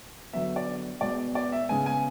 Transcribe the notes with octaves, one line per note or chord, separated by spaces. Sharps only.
D3 F#3 B3 E5
D5
B2 G#3 B3 D5
D5
E5
C#3 G#3 B3 G#5
G#5